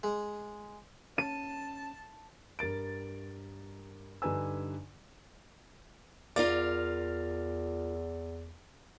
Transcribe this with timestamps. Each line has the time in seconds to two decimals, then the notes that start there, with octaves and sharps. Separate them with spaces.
0.03 G#3
1.18 C#4 A5 D#7
2.59 G2 A#4 A6 D7
4.22 G2 D3 D#4 B4 G#5 E6
6.36 E2 F4 A#4 D5 F5